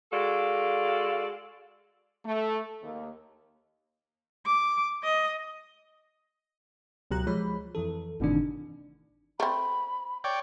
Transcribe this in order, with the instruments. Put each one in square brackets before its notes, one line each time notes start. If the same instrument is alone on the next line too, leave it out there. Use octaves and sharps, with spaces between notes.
[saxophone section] G#3 F#4 A4 D5 F5
[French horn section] A3
D#2
[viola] D6
D#5
[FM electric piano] C#2 B2 F#3 G4 A#5 F#6
F3 G#3 C#5 B5
F2 E3 A4
G1 A2 C3 D#3 E3 D4
[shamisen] A3 C4 [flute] B5
[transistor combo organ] C#5 D5 G5